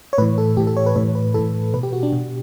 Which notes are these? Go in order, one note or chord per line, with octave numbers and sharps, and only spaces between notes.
C#5
A2 E3 B4
A4
A2 E3 G4
A4
C#5
B4
A2 E3 C#5
B4
A2 E3 A4
B2 B4
G4
F#4
D4
B2